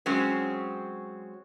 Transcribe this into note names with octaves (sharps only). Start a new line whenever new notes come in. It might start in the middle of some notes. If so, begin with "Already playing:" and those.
F#3 G#3 C4 C#4